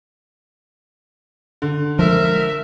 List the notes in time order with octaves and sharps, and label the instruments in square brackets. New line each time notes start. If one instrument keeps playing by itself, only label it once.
[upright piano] D3
[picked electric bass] F3 G#3 [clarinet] A#4 [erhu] E5